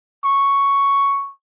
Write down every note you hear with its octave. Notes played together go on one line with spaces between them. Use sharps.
C#6